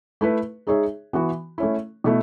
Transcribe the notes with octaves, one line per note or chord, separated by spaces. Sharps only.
A3 E4 B4
G#3 D#4 G#4 C#5 E5
E3 B3 F#4
A3 C#4 E4
B2 A3 E4